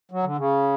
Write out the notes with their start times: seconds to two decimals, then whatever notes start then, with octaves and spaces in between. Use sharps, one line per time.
0.11 F#3
0.23 D3
0.37 C#3